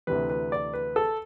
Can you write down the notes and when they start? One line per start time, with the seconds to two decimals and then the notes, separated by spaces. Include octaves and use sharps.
0.07 D2 C3 E3 B4
0.30 B4
0.52 D5
0.74 B4
0.96 A4